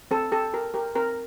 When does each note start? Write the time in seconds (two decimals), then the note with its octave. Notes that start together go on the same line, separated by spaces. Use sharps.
0.11 C4 A4
0.32 G4 A4
0.54 G4 A#4
0.74 G4 A#4
0.95 C4 A#4